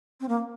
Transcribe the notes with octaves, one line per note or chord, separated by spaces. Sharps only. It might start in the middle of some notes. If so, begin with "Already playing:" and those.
C4
A#3